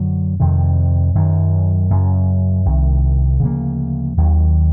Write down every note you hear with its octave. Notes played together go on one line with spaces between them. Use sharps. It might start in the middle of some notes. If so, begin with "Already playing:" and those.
Already playing: F#2 D3 F#3
F2 C3 D#3
F#2 D#3 F#3
F#2 C#3 F#3
C2 C3 D#3
D2 C#3 F3 A#3
D#2 D#3 F#3